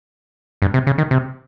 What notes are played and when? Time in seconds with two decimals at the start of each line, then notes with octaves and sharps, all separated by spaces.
0.62 G2
0.74 C3
0.87 C#3
0.98 D#3
1.11 C3